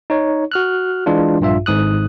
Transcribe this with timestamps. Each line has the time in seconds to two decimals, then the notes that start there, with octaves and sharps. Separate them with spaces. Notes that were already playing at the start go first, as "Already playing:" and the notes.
0.10 D#4 C#5
0.52 F#4 F6 F#6
1.06 E3 G#3 D4 F4
1.40 A#1 G2 F4 E5
1.66 G#1 G#2 D#6 F#6